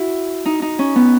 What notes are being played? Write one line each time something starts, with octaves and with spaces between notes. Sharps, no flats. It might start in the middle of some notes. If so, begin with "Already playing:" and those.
Already playing: E4 F#4
D#4
D#4
C#4
B3